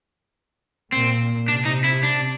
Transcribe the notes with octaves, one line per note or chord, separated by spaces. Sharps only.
A#2 C4
C3 D4
D#4
E4
D4